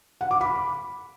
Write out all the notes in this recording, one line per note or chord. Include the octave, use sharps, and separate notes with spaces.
F#5
D6
B5